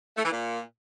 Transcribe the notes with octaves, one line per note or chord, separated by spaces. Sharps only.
A3
E3
A#2